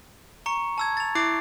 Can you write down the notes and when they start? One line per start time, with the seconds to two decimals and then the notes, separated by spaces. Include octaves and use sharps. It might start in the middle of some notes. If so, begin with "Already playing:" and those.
0.46 A#5 C#6 C#7
0.78 A5 E6 G#6
0.97 A6 F7
1.15 E4 D6 C7